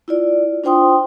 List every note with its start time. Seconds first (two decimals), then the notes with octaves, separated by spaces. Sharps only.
0.08 E4 F4 D5
0.64 D4 F4 C5 G5 C6 D#6